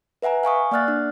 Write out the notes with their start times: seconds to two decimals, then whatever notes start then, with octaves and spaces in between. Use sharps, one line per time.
0.22 B4 E5 F#5 G#5 A#5
0.43 F5 G#5 C#6 D#6
0.71 A#3 D5 F#5 F6 F#6 A6
0.88 D4